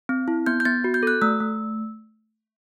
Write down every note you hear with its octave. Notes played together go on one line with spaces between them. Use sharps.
C4
E4
B3 G6
G6
B3 A6
F#4
G6
A4 F#6
A3 E6
A3